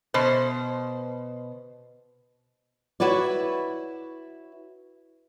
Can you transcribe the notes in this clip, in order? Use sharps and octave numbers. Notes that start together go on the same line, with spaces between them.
B2 C5
E4 F#4 B4 C#5 D5